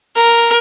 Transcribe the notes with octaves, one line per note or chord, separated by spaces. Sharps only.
A#4